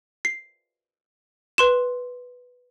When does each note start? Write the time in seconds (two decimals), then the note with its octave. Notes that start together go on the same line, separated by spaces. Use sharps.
0.25 C7
1.58 B4 C6 E7